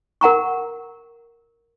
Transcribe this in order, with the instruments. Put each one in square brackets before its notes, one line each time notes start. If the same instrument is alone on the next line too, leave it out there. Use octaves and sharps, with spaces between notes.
[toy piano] A#4 F#5 A#5 C#6